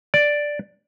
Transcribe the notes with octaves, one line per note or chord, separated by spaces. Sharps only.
D5